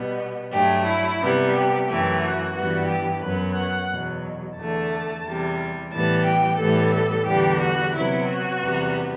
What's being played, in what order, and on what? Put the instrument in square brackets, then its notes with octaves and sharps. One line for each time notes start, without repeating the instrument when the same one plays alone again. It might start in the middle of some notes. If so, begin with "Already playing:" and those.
Already playing: [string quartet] B2 G3 B3
G2 F#3 A3 G4
E4
C3 G3 B3
G4
F#2 E3 A3 G4
F#4
G2 E3 G3 B3 F#4
G4
F#2 F#3 B3 B4
F#5
E2 B2 F#3
E2 D3 A3 A5
E2 C3 G3
A2 E3 G3 B3 A5
G5
A2 E3 G3 B3 A4
E2 D3 G3 B3 G4
F#4
C3 F#3 B3 E4
F#4
E2 C3 G3 B3